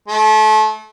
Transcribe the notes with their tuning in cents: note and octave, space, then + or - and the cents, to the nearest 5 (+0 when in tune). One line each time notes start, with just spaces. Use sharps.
A3 -30